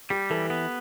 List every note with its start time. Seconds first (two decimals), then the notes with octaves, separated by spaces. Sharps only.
0.10 G3 G4
0.30 E3 A4
0.50 B3